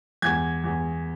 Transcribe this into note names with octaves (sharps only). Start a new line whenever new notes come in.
E2 G#6
E2